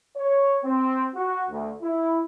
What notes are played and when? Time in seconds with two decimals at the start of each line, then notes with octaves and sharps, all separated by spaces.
0.17 C#5
0.64 C4
1.15 F#4
1.50 D2
1.82 E4